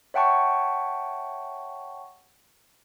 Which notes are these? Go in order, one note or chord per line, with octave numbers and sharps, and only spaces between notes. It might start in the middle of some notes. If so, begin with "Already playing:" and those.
C#5 E5 F#5 G5 A5 C#6